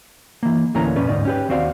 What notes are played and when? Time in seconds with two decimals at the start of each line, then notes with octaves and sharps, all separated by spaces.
0.43 E3 A#3
0.74 D2 A2 E3 A#3 C#4 A#5
0.96 F2 A#2 C#4 B4 D5
1.09 D2 G#2 D#4 D5
1.25 C#4 G4 B4
1.49 D#2 C4 F#4 D5 F5